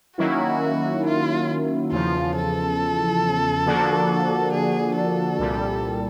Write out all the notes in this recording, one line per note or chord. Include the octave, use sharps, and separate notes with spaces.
D#3 F#3 A#3 C#4 E4 F#4
F4
E2 C#3 F3 F4
A4
D3 F3 A#3 D4 F#4
G#4
A4
C2 A#2 G3